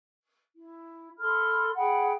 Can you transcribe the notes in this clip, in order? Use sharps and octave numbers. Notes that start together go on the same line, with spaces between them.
E4
A4 B5 C6 F6
G#4 F#5 G5 B5